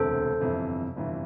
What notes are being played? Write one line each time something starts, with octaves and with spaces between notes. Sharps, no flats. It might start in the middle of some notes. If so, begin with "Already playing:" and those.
Already playing: E1 D2 C3 A4 C5
G1 F2 C3 E3
G1 F2 C3 E3